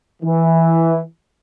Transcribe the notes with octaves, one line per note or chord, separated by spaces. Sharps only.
E3